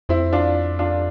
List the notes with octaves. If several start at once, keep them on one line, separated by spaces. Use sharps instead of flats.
F2 C4 E4
D4 F4
D4 F4